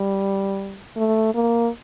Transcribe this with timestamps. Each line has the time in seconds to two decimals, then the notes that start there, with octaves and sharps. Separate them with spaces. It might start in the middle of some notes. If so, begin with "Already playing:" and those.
Already playing: G3
0.96 A3
1.34 A#3